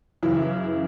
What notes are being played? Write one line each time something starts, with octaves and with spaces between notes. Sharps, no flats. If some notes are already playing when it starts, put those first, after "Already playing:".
F#2 C#3 E3 E4